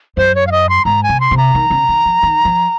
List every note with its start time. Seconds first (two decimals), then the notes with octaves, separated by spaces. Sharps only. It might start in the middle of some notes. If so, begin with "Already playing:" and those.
0.17 F#2 C5
0.35 C#5
0.47 F5
0.51 D#5
0.69 C6
0.85 G#2 A#5
1.03 G#5
1.09 C3
1.20 C6
1.31 C3
1.37 A#5
1.55 D#3
1.70 C#3
1.89 D#3
2.05 F3
2.23 D#3
2.45 F3